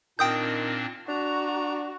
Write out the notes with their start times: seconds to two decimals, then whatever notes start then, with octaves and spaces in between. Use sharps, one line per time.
0.19 A#2 D#3 C4 D4 G5 D#6 G6
1.08 D4 F#4 A#5